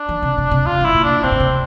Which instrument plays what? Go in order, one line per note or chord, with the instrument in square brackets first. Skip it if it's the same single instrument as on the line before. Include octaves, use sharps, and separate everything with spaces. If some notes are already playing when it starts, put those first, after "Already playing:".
Already playing: [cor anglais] D4
[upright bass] E3
C3
C3
C3
[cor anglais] F4
[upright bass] G2 [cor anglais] E4
[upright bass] A#2
[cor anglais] D4
[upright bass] C3 [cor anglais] C4
[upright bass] A#2
C3